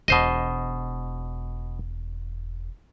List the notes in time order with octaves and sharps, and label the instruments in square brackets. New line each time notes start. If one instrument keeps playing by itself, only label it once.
[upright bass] E1 [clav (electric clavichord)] B2 C5 D#5